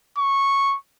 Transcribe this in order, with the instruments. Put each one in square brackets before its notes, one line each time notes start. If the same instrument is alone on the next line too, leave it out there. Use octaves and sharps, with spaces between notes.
[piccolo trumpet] C#6